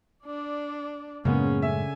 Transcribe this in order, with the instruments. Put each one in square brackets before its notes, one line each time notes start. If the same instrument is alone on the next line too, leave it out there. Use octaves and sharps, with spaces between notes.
[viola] D4 D5
[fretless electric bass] F#2 A2 G#3 [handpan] C#3 [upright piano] A#3 B3 [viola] C#4
[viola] D3 G#5 [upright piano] E5